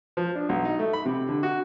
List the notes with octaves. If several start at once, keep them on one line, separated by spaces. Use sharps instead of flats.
F3
D4
B1
D#4
A3
B5
C3
D3
F#4